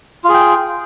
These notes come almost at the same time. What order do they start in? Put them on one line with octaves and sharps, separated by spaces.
F4 G#4 G5